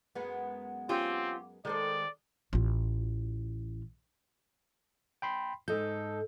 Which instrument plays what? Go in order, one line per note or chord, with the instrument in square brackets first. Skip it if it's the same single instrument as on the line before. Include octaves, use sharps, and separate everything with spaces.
[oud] F#2 G#3 B3
[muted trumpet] C4 [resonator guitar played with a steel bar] C#4 F4 G4
[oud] D#3 A4 C5 [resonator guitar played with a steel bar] G#3 [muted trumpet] D5
[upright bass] A1 F4
[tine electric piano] G5 B5 C6
[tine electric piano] G#2 D#5 G6 [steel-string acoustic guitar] A4